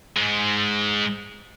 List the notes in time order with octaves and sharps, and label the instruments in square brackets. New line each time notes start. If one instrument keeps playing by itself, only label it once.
[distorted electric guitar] G#2 G#3